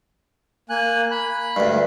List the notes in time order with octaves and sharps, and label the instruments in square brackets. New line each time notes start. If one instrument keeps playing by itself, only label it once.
[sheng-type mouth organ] A#3 G#5 F#6
B5 F#6
[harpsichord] D2 G2